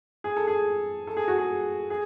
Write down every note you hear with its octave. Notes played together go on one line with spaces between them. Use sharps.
G#4
A4
G#4
A4
G#4
F#4
G#4
G#4